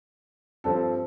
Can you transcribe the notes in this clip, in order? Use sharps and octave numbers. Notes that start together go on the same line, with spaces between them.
G2 F3 C4 A4